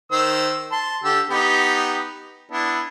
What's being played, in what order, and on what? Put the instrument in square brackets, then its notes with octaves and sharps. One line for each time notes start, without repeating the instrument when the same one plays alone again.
[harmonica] D#3 C5 E6
A5 C6
D3 G4 E6
B3 D#4 G4
B3 D4 E4